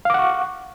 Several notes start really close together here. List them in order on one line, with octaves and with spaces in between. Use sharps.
F5 D6 F#5 C#6